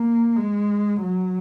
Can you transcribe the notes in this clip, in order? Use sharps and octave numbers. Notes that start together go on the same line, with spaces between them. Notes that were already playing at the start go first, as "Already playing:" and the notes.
Already playing: A#3
G#3
F#3